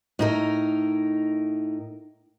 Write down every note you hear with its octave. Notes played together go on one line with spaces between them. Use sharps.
A2 D#4 A#4